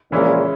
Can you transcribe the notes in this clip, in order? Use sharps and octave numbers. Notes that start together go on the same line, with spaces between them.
A#1 A#2 C#3 E3 G#3 C#4 E4